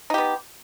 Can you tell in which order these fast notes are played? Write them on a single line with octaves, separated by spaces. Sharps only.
D#4 G4 B3